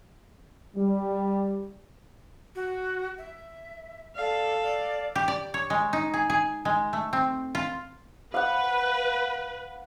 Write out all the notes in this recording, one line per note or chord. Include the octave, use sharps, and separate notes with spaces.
G3
F#4
E5
A4 D5 F5
D5
G4
D5
C#5
G#3
D#4
G#4
G#4
G#3
A3
C4
F4
B4 F5 F#5